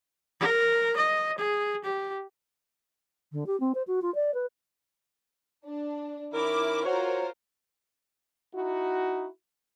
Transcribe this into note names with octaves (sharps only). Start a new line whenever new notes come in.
A#4
D#5
G#4
G4
D3
G4
C4
C5
F#4
F4
D5
B4
D4
D#3 C#4 E4 A#4 D6
F4 F#4 A#4 C5 C#5
D#4 E4 F#4